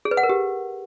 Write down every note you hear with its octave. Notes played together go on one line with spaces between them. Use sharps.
G#4
B4
F#5
A#4
G4